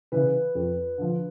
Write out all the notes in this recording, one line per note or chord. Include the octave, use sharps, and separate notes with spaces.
C#3 E3 B4
F2
D3 F3